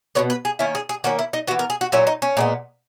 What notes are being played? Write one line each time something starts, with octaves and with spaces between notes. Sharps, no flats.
B2 G#3 B3 C#5
B4
G#4
D#3 A#3 C#4 E4
G#4
G#4
D#3 A#3 C#4 F#4
E4
D#4
E3 B3 F#4
A#4
G#4
F#4
A#2 F#3 C#4 E4
D#4
C#4
A#2 G#3 B3